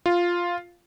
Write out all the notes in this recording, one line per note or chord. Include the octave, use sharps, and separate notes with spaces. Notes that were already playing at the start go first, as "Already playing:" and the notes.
F4